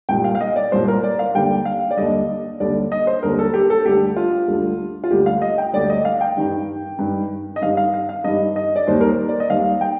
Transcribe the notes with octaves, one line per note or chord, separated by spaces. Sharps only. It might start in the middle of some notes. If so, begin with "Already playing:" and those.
C2 A#2 G3 G5
F5
F5
D#5
D5
C2 A#2 G3 C5
A#4
D5
F5
D#2 D3 G3 G5
F5
D5
D#2 D3 G3 D#5
D#2 D3 G3 D5
D#5
C5
D#2 D3 G3 A#4
A4
G4
A4
D2 D3 G3 G4
F4
D2 D3 G3
F4
D2 D3 G3 G4
F5
D#5
G5
D2 D3 G3 D5
D#5
F5
G5
G2 D#3 G3
G2 D#3 G3
D#5
G2 D#3 G3 F5
F5
F5
F5
G2 D#3 G3 D#5
D#5
D5
D#2 D#3 G3 C5
A#4
C5
D5
D#5
D#2 D#3 G3 F5
G5